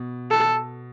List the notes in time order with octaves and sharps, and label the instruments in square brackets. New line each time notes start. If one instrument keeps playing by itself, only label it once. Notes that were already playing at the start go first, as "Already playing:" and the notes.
Already playing: [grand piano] B2
[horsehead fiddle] A4